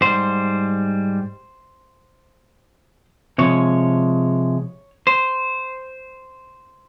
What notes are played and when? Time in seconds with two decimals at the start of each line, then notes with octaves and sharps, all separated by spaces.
0.01 G#2 G3 C5
3.38 C3 F3 G#3 C#5
5.07 C5